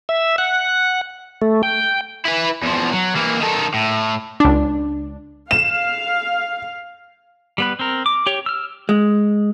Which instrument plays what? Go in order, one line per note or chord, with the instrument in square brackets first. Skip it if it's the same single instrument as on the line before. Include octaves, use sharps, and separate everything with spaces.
[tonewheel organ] E5
F#5
A3
G5
[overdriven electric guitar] E4 B4
E2 F3
F#3
E3 A#3
D#3 A4
A2
[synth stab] C#2 D4
[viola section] F5 [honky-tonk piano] E7
[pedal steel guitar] G3 B3 B4
C4 A#4
D6
G4 C#5
E6 F6
[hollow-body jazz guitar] G#3